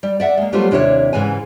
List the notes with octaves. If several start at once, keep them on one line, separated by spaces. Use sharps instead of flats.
G3
D5 E5 F#5
G#3 A#3
F#3 G3 A3 B3 F4 C5
D#2 C3 D4 E4 A#4 C#5
G#2 C#3 E3 G#5